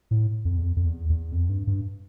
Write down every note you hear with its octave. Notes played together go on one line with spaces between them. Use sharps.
A2
F2
E2
F2
F2
E2
E2
F2
G2
G2